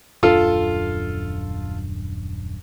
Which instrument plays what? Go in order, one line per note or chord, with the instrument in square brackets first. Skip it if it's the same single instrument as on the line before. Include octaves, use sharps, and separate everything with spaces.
[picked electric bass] D#1 F#2 D4 [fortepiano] F4 A4